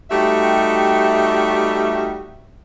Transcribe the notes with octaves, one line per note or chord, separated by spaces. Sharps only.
G3 A3 D#4 F#4 G4 E5